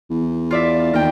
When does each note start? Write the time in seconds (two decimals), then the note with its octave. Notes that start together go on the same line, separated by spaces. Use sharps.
0.10 E2
0.51 F4 D5 E5
0.93 D#2 A#4 G5